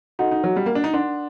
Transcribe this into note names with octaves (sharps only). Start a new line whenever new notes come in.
D#4 F#4 A4 D#5 F#5
D#4
F#3
G3
A#3
D4
D#4
D4 A#4 F#5 C6